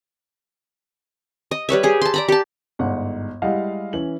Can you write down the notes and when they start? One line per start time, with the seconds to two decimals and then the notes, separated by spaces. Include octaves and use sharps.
1.51 D#5
1.69 G3 B4 C#5 E5
1.83 G4 G#4
2.02 A5 C6
2.14 D5 A#5 B5
2.28 G4 A5
2.79 G1 G#2 D5 F#5
3.42 G3 G#3 E4 D#5 F5 F#5
3.93 E3 C#4 E4 F#7